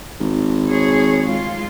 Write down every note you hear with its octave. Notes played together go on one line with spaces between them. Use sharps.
G#1
G#4 C#5
G#3 F4